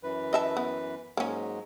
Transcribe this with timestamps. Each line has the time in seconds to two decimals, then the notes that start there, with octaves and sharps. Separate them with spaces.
0.03 F#2 E3 B4
0.33 D#5 E5 A5
0.57 B3
1.17 G#2 F#3 G#3 A#3 C#4